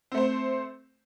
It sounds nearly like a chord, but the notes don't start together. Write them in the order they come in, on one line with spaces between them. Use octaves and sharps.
C4 A3 C5